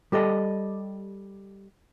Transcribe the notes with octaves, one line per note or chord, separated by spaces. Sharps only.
G3 G4 A4 D#5